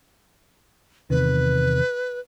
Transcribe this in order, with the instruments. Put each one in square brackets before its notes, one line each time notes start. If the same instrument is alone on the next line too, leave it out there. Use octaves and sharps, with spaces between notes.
[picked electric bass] E2 C3 D#3 [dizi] B4